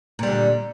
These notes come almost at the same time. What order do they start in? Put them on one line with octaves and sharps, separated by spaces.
A#2 G3 D3